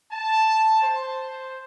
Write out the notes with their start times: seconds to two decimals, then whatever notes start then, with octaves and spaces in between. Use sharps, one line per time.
0.11 A5
0.82 C5